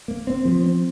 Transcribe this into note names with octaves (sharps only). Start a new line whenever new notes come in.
A#3
C4
F3
C4